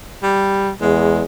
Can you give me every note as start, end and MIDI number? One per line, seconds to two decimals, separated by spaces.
0.23 0.71 55
0.81 1.23 40
0.81 1.22 56